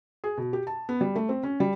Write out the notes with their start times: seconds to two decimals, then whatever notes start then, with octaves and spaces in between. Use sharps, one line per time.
0.24 G#4
0.37 B2
0.53 G4
0.67 A5
0.89 B3
1.01 G3
1.15 A3
1.29 C4
1.43 C#4
1.60 G3